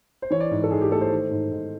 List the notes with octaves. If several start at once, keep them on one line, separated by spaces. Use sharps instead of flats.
C5
E3 C#5
D5
G#2
A4
G#2 G#4
G4
A3 A4
C5
D#3
G#2
G#2